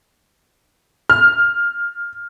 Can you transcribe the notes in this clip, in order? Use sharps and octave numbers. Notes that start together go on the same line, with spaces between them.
F6